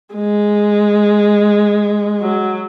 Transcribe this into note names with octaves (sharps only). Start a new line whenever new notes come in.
G#3
F#3